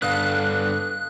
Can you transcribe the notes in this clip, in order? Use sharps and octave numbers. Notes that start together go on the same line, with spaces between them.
G2 D3 B3 D4 D#5 F5 F#6